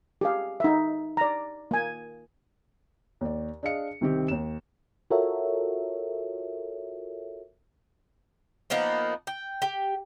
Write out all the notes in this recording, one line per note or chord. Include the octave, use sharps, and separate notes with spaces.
G4 G#4 F5
D#4 E5
D5 A#5
A#3 G#5
D#2 D5
D4 G#4 D#5 F5 C#7
C2 D#3 C4 G4
D#2 E7
F4 F#4 A4 A#4 C#5 E5
F3 A#3 B3 D#4
G5
G4